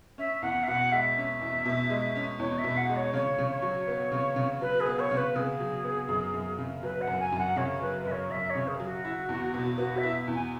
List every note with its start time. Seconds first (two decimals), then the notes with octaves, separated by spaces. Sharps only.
0.18 C#4 E5
0.42 E2 F#5
0.63 E5
0.67 B2 F#5
0.92 G#3 E5
1.17 C#4
1.41 E2
1.65 B2
1.90 G#3
2.16 C#4
2.39 E2 C#5
2.58 E5
2.64 B2
2.76 F#5
2.89 G#3
2.95 C#5
3.13 C#3 C#5
3.38 C#3
3.50 C#5
3.62 F#3
3.87 B3
4.12 C#3
4.36 C#3
4.61 F#3 B4
4.80 G#4
4.86 B3
4.99 C#5
5.11 C#3
5.17 B4
5.35 C#3 G#4
5.60 F#3
5.84 B3
6.08 F#2
6.34 F#2
6.58 C#3
6.83 F#3 B4
7.01 F#5
7.07 F#2
7.19 G#5
7.32 F#2
7.38 F#5
7.56 C#3 C#5
7.81 F#3 B4
8.05 F#2 E5
8.11 C#5
8.30 F#2 E5
8.49 C#5
8.55 C#3
8.68 G#4
8.80 F#3
8.85 F#4
9.05 E4
9.29 E2
9.54 B2
9.78 B3 F#4
9.97 E5
10.03 E4
10.28 E2
10.34 G#5